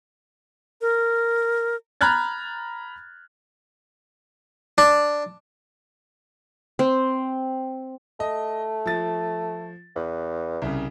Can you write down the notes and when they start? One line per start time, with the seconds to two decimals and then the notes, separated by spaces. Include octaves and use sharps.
0.81 A#4
2.01 A#5 B5 F6 F#6 G#6 A6
4.78 D4
6.79 C4
8.20 A3 D#5
8.86 F3 A6
9.96 E2 B4
10.62 C2 C#3